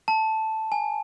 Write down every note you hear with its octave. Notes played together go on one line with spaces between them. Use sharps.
A5
G#5